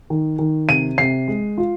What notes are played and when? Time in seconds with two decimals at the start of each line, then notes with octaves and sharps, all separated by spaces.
0.10 D#3
0.39 D#3
0.69 C3 D#7
0.98 C3 C7
1.28 G#3
1.58 F4